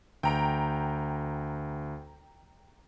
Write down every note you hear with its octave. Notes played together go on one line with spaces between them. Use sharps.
D2 G5 A#5 D7